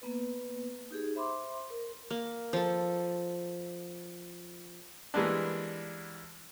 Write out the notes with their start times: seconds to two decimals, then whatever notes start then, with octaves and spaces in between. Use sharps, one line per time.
0.02 A#3 B3 B4
0.91 D#4 G4 G#4
1.15 C5 E5 B5 C6 D6
1.70 A#4
2.10 A#3
2.53 F3 A4
5.14 E3 G3 G#3 A#3 B3 D4